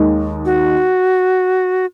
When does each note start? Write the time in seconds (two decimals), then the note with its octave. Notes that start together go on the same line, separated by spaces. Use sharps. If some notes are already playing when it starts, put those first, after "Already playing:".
Already playing: D#2 D#3 G#3
0.45 F#4